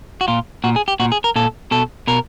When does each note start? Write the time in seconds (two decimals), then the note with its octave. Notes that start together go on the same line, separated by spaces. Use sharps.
0.21 F#4
0.28 A#2 F4
0.64 A#2 F#4
0.76 G#4
0.88 G4
1.00 A#2 F#4
1.12 G#4
1.24 A#4
1.36 A#2 A4
1.71 B2 A4
2.07 B2 A#4